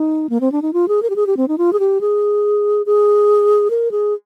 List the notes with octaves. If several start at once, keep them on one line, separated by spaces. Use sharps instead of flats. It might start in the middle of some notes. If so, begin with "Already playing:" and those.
Already playing: D#4
A#3
C4
D4
D#4
F4
G#4
A#4
G4
G#4
G4
C4
D#4
F4
G#4
G4
G#4
G#4
A#4
G#4